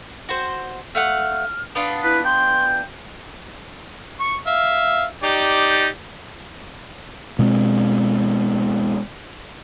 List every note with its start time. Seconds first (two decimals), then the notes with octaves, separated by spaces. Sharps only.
0.29 F#4 C5
0.95 A3 F5 F#5 F6
1.75 B3 D4 F4
2.03 E4 B4
2.25 G5 C6
4.20 C#6
4.47 E5 F5
5.23 D#4 G4 D5
7.39 B2 G#3 B3 C4